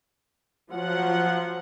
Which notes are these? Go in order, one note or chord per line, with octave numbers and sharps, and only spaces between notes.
F3 F#3 F#5